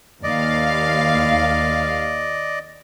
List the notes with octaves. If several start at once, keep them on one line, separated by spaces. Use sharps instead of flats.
D#2 D5 D#5 F5